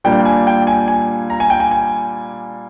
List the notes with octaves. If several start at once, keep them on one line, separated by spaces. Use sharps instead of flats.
A#2 G3 A#3 D4 G5
G#5
G5
G#5
G#5
A#5
G#5
G5
G#5
G#5